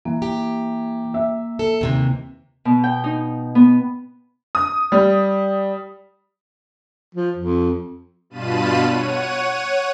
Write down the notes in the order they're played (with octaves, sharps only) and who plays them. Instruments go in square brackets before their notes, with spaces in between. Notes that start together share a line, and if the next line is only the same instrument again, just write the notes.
[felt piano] E3 [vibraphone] A#3
[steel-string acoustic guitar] G4
[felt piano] E5
[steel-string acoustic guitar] A4
D#2 C3 E3
[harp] B2
G5
D#4
B3
[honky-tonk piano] D#6
G3
[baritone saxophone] F3
F2
[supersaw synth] G2 B2 F4 A5 B5 D#7
C#5 F#5 D#7